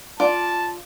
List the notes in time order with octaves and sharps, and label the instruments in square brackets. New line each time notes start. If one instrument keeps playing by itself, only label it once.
[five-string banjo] F4 D5 [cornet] A5